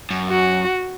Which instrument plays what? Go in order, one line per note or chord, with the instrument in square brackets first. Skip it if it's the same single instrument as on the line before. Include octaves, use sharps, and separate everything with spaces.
[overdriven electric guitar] F#2
[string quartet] F#4